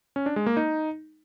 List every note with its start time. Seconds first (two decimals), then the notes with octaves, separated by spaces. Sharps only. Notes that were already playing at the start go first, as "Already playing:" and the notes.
0.16 C#4
0.26 D4
0.36 G#3
0.46 A#3
0.57 D#4